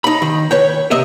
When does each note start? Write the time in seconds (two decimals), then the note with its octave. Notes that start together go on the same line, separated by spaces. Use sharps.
0.04 D#4 B5
0.22 D#3
0.51 B4 C#5 G5
0.91 C3 D#5 E5